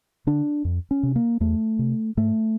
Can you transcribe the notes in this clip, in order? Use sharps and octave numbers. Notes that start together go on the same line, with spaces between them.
D3 D4
F2
C#4
C3
A#3
E2 A3
C3
G#2 A3